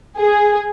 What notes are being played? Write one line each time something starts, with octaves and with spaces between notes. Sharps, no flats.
G#4